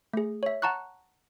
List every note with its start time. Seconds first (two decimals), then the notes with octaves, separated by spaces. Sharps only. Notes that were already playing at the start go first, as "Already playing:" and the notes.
0.13 A3 G#4
0.43 C#5 E5
0.62 F#5 A5 A#5 C#6 F#6